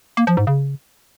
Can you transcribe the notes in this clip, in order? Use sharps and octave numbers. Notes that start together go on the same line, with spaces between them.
A#3
F3
G#2
C#3